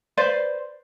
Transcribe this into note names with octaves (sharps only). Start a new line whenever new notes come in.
B4 C5 D5